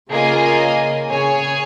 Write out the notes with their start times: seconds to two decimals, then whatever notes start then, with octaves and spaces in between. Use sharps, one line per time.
0.10 C#3 A#3 F4 G#4 D#5 G#5
1.09 C#3 G#4 C#5 G#5